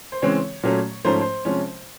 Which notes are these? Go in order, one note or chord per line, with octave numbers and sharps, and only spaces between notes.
C5
C#3 E3 G#3 C4 C#5
A#2 F#3 A3 C#4
G#2 F3 A3 C#4 C5
C5
C3 F3 G#3 C#4